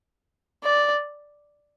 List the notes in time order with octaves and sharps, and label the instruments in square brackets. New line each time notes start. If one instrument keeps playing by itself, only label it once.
[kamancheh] D5